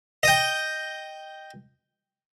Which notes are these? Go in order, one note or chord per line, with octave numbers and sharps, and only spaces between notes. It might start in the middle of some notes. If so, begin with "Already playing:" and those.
D#5 G5